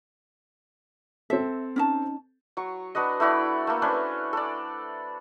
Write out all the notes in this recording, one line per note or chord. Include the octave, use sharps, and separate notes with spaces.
C4 A4 E5
C#4 D#4 A5
F#3 C#6
D4 F#4 B4 D#5
A3 E4 F#4 D5
A3 A#3
C#4 D4 B4 C5
A4 D5